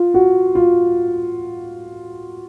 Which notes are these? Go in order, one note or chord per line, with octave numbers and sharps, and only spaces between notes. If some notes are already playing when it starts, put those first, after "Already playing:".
Already playing: F4
F#4
F4